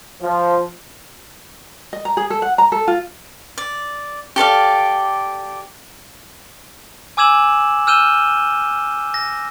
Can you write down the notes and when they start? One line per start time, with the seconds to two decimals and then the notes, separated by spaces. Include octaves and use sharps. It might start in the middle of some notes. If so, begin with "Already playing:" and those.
0.22 F3
1.93 D#5
2.05 A#5
2.17 G#4
2.30 A4
2.42 F#5
2.58 A#5
2.72 A4
2.88 F4
3.58 D5
4.36 G4 A4 D5 F5
7.17 G#5 D6 E6 G#6 E7 F#7
7.87 E6 F6 G6 D#7 E7 G7
9.14 A#6